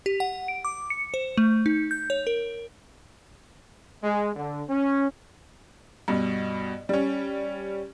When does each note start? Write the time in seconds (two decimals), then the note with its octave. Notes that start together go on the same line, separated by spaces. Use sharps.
0.06 G4
0.20 F#5
0.48 D7
0.65 D6
0.90 C#7
1.14 C5
1.37 A3
1.66 D#4
1.91 G6
2.10 C#5
2.27 A#4
4.03 G#3
4.35 D3
4.69 C#4
6.08 G2 B2
6.89 G3 C#4